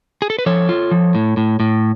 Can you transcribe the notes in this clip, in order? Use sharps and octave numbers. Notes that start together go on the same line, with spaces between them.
G#4
A4
B4
F3 A4 C#5
F4
F3
A2
A2
A2